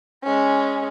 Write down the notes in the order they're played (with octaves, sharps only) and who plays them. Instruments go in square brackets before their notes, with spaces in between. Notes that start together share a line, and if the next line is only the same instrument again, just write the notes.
[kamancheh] G#3 C#4